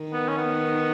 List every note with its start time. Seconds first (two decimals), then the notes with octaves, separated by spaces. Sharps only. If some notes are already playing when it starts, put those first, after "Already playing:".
Already playing: D#3
0.13 B3
0.29 C#4
0.38 B3